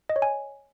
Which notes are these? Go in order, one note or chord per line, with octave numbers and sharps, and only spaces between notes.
D#5
C#5
G#5